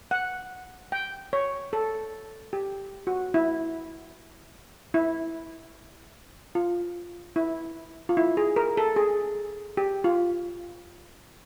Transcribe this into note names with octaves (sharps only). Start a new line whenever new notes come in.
F#5
G5
C#5
A4
G4
F#4
E4
E4
F4
E4
F4
E4
G#4
A#4
A4
G#4
G4
F4